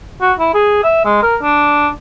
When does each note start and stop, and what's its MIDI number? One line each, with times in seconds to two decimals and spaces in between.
0.21 0.33 66
0.39 0.50 64
0.54 0.80 68
0.83 1.01 76
1.05 1.23 56
1.23 1.36 70
1.43 1.89 62